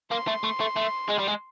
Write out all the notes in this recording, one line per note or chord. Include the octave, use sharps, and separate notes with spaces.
A#3 C6
A3
A3
A3
A3
G#3
G3
G#3